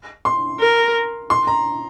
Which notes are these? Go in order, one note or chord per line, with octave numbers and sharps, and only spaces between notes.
C6
A#4
C6
A#5